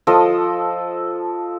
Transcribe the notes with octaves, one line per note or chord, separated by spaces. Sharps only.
F3 A4 D#5 D#6